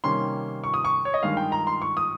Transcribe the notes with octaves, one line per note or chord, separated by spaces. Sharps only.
C3 D#3 G3 A#3 C#4 C6
C#6
D#6
C#6
C#5
D#5
G2 D#3 G#3 F5
G5
A#5
C6
C#6
D#6